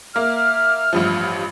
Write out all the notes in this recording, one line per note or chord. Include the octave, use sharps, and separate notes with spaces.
A#3 E5 F6
A1 G2 F3